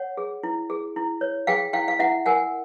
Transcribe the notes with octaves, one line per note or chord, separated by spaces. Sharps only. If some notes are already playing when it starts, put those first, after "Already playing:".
Already playing: C#5 F#5
G#4
E4
G#4
E4
C#5
G#4 F5 G5
E4 F5 G5
F5
E4 E5 F#5
A#4 F#5 G#5